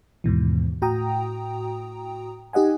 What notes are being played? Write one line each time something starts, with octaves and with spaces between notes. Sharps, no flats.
D#2 G#2 B2 E3
A2 F#4 G5 A#5 D#6
D#4 G4 D#5 F#5 G#5